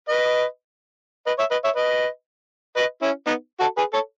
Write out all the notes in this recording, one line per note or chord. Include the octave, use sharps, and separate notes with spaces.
B4 D#5
B4 D#5
C#5 E5
B4 D#5
C#5 E5
B4 D#5
B4 D#5
C#4 E4
B3 D#4
F#4 A4
G#4 B4
A4 C#5